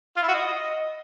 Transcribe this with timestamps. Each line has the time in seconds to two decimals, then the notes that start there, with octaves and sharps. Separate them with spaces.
0.16 F4
0.22 E4
0.28 F#4
0.34 D#5